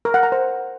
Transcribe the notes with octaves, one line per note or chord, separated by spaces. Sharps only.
A#4
F#5
A#5
C5